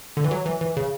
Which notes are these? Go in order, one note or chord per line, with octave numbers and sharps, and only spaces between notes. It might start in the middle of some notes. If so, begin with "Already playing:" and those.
D3
E3
F#3
E3
E3
C#3